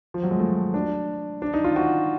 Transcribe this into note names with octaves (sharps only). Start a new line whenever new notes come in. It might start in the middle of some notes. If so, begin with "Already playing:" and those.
F3
F#3
G#3
A3
D4
D4
D#4
F4
F#4